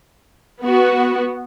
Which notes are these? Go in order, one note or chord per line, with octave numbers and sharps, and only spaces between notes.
B3 F#4